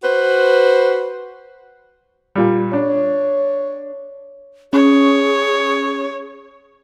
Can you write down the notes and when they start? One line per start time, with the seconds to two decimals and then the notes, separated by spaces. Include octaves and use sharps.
0.03 F#4 B4 C5
2.35 A#2 G3
2.73 D4 C#5
4.73 C#4 G#4 C#5 C#6